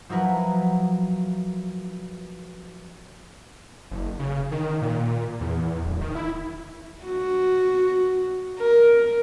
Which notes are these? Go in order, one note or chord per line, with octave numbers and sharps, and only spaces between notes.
F3 F#3 E4 A#4 B4
F#1
C#3
D#3
A#2
E2
D1
D#3
E4
F#4
A#4